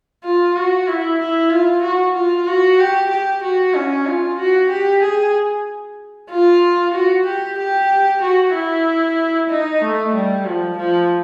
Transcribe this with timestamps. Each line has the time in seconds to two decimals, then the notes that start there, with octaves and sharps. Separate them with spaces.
0.24 F4
0.56 F#4
0.88 E4
1.19 E4
1.51 F4
1.83 F#4
2.15 F4
2.47 F#4
2.79 G4
3.11 G4
3.43 F#4
3.75 C#4
4.06 F4
4.39 F#4
4.70 G4
5.03 G#4
6.30 F4
6.94 F#4
7.26 G4
7.59 G4
8.22 F#4
8.54 E4
9.49 D#4
9.81 A3
10.14 G3
10.46 F3
10.77 F3